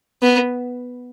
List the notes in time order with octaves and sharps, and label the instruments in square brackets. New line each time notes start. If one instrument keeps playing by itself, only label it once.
[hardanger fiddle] B3